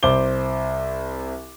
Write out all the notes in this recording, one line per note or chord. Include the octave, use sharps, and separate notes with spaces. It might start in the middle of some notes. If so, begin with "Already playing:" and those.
C2 C5 D6 G7